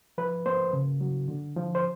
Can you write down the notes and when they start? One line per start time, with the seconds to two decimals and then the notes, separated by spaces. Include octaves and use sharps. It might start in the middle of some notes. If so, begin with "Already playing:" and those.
0.18 F3 B4
0.46 A#3 C5
0.73 C#3
1.01 F#3
1.28 D3
1.56 F3
1.75 C5